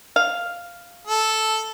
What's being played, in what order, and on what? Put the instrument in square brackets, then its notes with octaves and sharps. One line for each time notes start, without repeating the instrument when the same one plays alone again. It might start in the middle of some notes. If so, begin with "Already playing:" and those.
[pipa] F5
[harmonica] A4